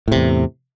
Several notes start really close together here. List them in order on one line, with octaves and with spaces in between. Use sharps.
A2 C3 E2